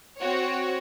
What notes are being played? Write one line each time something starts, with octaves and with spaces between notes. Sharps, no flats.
C4 F#4 C#5